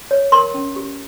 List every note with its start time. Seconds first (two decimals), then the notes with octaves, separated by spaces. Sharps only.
0.11 C#5
0.32 A#4 C6
0.54 C#4
0.76 G4